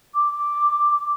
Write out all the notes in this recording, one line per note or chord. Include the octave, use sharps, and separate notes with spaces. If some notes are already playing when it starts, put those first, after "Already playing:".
D6